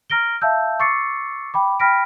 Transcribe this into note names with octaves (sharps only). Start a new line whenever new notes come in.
A#5 F6 A#6 D7 G7
E5 F5 A5 E6 G6
C#6 D6 E6 A6 C7 C#7
G5 B5 D6
G5 B5 F6 A#6 B6 D7